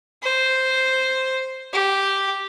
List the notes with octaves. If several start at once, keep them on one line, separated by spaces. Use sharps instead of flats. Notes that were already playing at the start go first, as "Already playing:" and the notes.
C5
G4